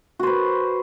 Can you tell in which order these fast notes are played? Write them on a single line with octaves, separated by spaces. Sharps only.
F#4 C5 B4